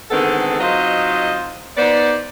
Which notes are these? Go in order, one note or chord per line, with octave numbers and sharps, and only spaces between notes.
D3 D#3 G#3 B3 C4 A4
F#3 C4 D#4 F4 C5 D#5
B3 D#4 C5 D5